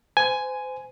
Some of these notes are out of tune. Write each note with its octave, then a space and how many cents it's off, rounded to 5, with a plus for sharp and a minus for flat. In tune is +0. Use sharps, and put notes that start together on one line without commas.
C5 -35 G#5 +5